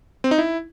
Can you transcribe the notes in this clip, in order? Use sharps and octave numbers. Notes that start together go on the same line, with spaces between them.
C4
D#4
E4